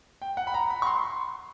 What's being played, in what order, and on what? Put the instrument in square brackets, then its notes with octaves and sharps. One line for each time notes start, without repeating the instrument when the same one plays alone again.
[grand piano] G5
F#5
B5
A#5
B5
C#6
C6